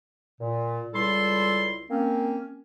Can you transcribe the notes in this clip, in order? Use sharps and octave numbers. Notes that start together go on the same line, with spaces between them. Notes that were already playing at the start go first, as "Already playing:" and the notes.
A#2
C#2 G3 E4 F4 A4 C6
A#3 C4 C#4